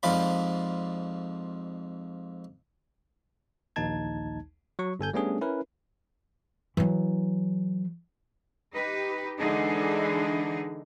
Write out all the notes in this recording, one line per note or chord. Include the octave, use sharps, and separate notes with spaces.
F2 G#2 F3 F4 D5 B5
A#1 D#2 D#4 A5 G#6
F#3 C#6
G1 A4 G#5 G6
G3 A3 B3 C#4 D4 G#4
C#4 E4 A#4 B4
E3 F#3
D#4 G4 B4
D3 E3 G#3 D4 D#4 G#4